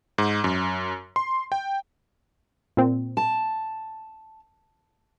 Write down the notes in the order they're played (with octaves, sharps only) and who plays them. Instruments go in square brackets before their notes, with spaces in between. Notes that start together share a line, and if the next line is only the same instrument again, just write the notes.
[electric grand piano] G#2
F#2
C6
G5
[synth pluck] A#2 C4
[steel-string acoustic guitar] A5